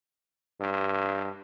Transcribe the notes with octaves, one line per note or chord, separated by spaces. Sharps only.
G2